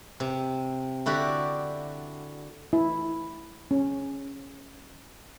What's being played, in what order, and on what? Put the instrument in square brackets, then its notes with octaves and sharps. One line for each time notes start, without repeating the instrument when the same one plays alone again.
[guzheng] C3
D3 E4 F#4 G4 D5
[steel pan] E4
C#4